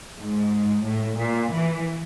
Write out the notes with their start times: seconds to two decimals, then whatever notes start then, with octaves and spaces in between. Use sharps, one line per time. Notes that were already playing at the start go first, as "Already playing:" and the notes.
0.16 G#2
0.84 A2
1.18 A#2
1.51 E3